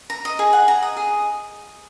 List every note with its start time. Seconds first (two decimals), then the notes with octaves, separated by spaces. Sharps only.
0.10 A#5
0.25 D#5
0.39 G#4
0.53 F#5
0.68 A#5
0.83 D#5
0.97 G#4